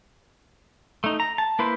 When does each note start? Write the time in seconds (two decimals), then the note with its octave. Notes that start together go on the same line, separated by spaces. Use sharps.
1.04 A3 D#4
1.20 A#5
1.38 A5
1.59 A#3 E4 B4 C5